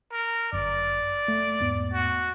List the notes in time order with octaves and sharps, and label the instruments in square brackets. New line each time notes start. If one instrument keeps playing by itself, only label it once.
[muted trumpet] A#4
[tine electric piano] G1 F#2 [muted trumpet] D5
[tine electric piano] A3
E2 G#2 B3
[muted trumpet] F#4